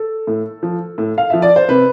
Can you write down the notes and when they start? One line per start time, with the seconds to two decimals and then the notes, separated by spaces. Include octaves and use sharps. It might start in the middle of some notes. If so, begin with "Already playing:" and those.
Already playing: A4
0.27 A2
0.63 F3
0.98 A2
1.18 F5
1.30 F3 E5
1.42 D5
1.56 C5
1.68 C3 B4